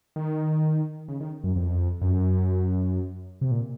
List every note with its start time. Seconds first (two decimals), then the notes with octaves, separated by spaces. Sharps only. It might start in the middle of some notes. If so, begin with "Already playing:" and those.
0.16 D#3
1.08 C#3
1.20 D#3
1.44 F#2
1.56 F2
2.01 F#2
3.41 C3
3.51 A#2